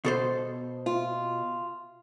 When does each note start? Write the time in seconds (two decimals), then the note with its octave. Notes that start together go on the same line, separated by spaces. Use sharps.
0.05 B2 A4 C5
0.86 F4